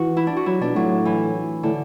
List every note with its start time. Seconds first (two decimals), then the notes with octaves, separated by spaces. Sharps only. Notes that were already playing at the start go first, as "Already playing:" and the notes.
Already playing: E3 F#4
0.17 E4
0.27 D4
0.37 F#4
0.46 F#3 E4
0.61 B2 D4
0.75 A2 F#3
1.05 E3
1.63 A2 D3